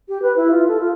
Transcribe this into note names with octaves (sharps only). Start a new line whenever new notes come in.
G4
B4
E4
F4
A4
F4